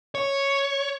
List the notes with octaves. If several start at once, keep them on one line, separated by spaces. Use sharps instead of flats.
C#5